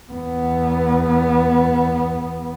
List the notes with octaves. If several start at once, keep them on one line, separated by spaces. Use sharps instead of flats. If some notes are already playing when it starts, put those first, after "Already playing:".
E2 B3